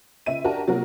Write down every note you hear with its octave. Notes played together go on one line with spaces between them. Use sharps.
C#2 E5 D#7
D4 F#4 G4 A#4 A5
C3 F#3 A#3 F4 F#4 A#4